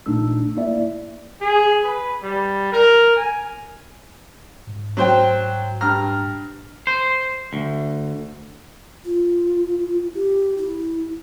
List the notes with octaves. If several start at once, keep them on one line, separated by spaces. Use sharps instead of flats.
A1 A#2 A3 D4 D#4 E6
A#3 E4 D5 E5
G#4
B4
G3
A#4
G#5
G#2
F#3 C5 G5
G2 A#5 F6
C5
D2
F4
G4
E4